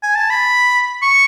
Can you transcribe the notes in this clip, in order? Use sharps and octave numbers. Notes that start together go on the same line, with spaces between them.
G#5
A5
B5
C#6